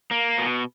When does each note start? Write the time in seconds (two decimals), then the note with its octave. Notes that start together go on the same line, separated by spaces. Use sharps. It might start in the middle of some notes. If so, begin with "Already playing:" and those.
0.11 A#3
0.38 B2